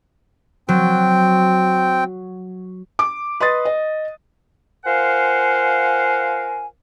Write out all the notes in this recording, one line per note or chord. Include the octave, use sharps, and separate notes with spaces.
F#3 C4 G5
D6
B4 D#5 C6 D#6 A6
D#5
F4 A#4 C5 F5 F#5 G#5